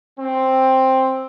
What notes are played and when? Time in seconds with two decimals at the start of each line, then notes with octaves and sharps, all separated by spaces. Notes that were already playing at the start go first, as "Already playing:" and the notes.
0.18 C4